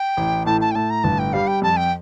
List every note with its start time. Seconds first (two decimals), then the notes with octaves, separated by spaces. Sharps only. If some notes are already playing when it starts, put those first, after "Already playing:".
Already playing: G5
0.17 A1
0.46 A2 A5
0.61 A5
0.71 G5
0.75 A2 A5
0.90 A#5
1.04 G1 A5
1.19 G5
1.33 G3 F5
1.47 G5
1.62 F2 A5
1.77 G5